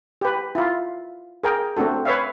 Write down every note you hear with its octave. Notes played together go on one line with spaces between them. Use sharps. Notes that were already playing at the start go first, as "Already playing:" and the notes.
G4 B4
E4 F4
G#4 A#4 G5
A3 C4 D4 F#4 A4
B4 C#5 E5 F5